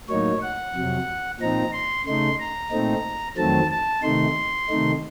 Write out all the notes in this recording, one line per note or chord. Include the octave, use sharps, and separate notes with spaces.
A2 F#3 A#3 D#4 C#5
F#5
F2 C3 F#3
A#2 F3 C4 D#4 A#5
C6
C#3 A3 D#4 C6
A#5
A#2 A3 C4 D#4
F2 D#3 F#3 A3 C4 A5
A5
C3 D#3 A3 D#4 C6
C3 D#3 A3 D#4